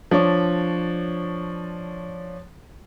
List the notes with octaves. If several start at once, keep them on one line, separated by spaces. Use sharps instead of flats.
F3 D4 C#5 D5